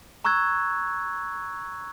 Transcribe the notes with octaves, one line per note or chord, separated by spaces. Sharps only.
A#5 C#6 E6 F#6 G#6